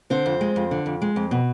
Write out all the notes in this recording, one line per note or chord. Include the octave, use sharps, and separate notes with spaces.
D3 C4 C5
F2
G#3
F2
D3
F2
G#3
F2
B2